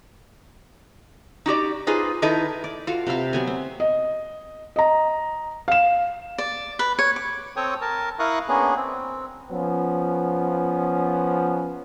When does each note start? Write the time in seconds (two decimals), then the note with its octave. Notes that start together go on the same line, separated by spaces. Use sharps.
1.46 D#4 F#4 G4 D5
1.87 D#4 F4 G#4 B4 C5
2.22 D#3 D#4 E4 A4 B4
2.64 D5
2.87 F4 F#4 A4 F5
3.07 C3 B4 E5 F5
3.33 F#3 B3 G#5
3.47 C4
3.80 D#5
4.76 D#5 A#5
5.68 F5 E7
6.38 D5
6.79 B4
6.99 C#5
7.16 D6
7.56 C4 A4 C#5 G5 C#6 D#6
7.81 A#4 A5
8.19 E4 A#4 F5 C#6 D#6 F#6
8.49 A#3 B3 C#4 D4 G#4
8.76 C4
9.51 F3 B3 C#4